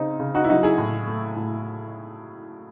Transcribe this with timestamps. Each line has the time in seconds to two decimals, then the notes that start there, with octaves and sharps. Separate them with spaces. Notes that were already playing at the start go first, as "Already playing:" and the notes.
Already playing: C#3 C4 D#4
0.20 C#3
0.35 D#4 F#4
0.44 E4
0.49 F#3 D#4 F#4
0.63 E4 G#4
0.78 A2
1.07 A3
1.36 A2